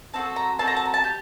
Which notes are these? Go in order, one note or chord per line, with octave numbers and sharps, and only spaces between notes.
C4 F#4 A4 A5
A#5
C4 F#4 A4 A5
A#5
A5
A#5
A5
G4